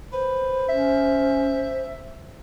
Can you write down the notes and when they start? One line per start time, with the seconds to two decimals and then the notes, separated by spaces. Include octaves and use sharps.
0.13 B4 C5
0.68 C#4 E5